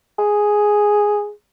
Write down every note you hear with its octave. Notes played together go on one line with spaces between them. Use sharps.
G#4